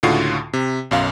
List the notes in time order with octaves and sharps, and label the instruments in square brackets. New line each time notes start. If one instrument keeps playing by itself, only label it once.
[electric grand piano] C#2 A2 D3 F4 F#4 C7
C3
B1 F#2 F5